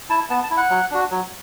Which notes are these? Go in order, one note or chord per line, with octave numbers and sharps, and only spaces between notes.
E4 A5
B3 A5
A5
E4
F#5
F#3
D4 F#4
F#3